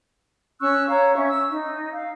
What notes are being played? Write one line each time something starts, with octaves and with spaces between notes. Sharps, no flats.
C#4 C#6 E6 F#6
C#5 F5 A#5
C#4 E5 C#6
E6
D#4
F5